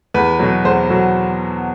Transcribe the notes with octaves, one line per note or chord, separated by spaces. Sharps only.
E2 B4
B2 F#3
E2 C5
B2 F#3